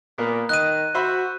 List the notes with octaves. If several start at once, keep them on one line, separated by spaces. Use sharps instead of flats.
A#2 A#3 B3 A#4
D#3 D#5 F#6 D#7
F#4 C5 E5 B5